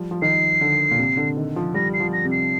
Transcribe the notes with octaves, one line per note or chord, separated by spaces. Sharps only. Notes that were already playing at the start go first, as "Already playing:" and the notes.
Already playing: F3 G3
F3
D#3 C7
D3
A#2
C3
D3
D#3
F3
G3 A#6
C7
F3
A#6
C3
C7